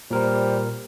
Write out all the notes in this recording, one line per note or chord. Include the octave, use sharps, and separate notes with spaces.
A#2 G3 A#4 C5